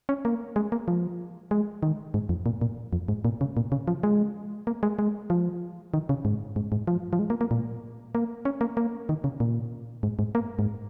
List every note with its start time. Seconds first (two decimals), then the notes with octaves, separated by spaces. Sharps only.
0.09 C#4
0.25 A#3
0.56 G#3
0.72 A#3
0.88 F3
1.51 G#3
1.83 D#3
2.14 G#2
2.29 F2
2.46 A#2
2.61 A#2
2.93 F2
3.08 G#2
3.25 A#2
3.41 C#3
3.57 A#2
3.72 C#3
3.88 F3
4.03 G#3
4.67 A#3
4.83 G#3
4.99 G#3
5.30 F3
5.94 D#3
6.09 C#3
6.25 G#2
6.56 G#2
6.72 G#2
6.87 F3
7.13 F3
7.19 G#3
7.30 A#3
7.41 A#3
7.51 A#2
8.15 A#3
8.45 C#4
8.61 A#3
8.77 A#3
9.09 D#3
9.24 C#3
9.40 A#2
10.03 G#2
10.19 G#2
10.35 A#3
10.59 G#2